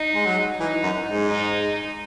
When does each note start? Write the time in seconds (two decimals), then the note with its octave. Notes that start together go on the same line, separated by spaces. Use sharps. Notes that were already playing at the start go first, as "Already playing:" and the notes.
Already playing: D#4
0.14 G#3
0.26 F#3
0.60 E3 D#4
0.83 F#2
1.06 G#2
1.28 D#4